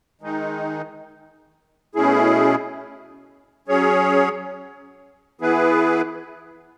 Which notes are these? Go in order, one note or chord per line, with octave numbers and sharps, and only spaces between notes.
D#3 G#3 D#4
B2 A3 C#4 E4 G#4
F#3 C#4 G#4 C#5
E3 B3 E4 G#4 B4